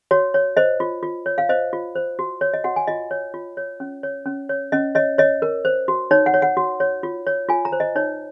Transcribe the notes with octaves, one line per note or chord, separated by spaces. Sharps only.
F#4 C#5
C#5
C5 D#5
F4
F4
C#5
F5
C5 D#5
F4
C5
F#4
C#5
D#5
F#4 F#5
G#5
F4 D#5
C#5
F4
C#5
C#4
C#5
C#4
C#5
C#4 D#5
C#5 D#5
C#5 D#5
A#4
C5
F#4
D#4 C#5
F#5
C#5
F#5
F#4
C#5
F4
C#5
F4 G#5
A#5
C5
D#5
D#4 C#5